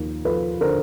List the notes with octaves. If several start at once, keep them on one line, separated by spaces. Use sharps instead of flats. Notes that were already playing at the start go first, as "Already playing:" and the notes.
Already playing: D#2 F3
F3 A4 B4
D3 A#4 C5